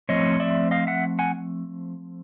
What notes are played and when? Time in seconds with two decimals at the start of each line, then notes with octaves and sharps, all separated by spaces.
0.09 F3 A3 C4 C#5 D#5
0.40 D5 E5
0.71 D#5 F5
0.87 E5 F#5
1.19 F#5 G#5